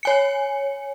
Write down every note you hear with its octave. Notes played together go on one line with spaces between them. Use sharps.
C#5 G#5 C#7